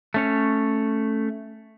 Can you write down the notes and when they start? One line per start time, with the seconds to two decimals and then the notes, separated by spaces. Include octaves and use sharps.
0.14 A3 C#4 C#5